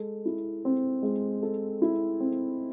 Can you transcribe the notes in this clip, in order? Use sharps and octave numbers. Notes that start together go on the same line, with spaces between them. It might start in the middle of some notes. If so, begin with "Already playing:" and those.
Already playing: G#3 A4
E4
C4
G#3
A4
E4
C4